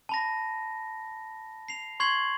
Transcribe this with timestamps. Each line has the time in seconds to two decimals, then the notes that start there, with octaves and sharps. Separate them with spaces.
0.09 A5 B5 A#6
1.69 C7 F7
2.00 C6 C#6 G#6 C7 F#7